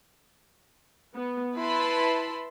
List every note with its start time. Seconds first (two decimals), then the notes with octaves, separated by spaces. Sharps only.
1.15 B3
1.56 E4 B4 A5 B5 C6